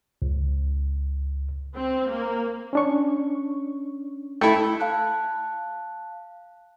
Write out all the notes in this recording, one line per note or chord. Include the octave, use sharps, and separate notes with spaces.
C#2
C4
A#3
C#4 D4 C#6
A3 E4 G5
F5 A5 F#6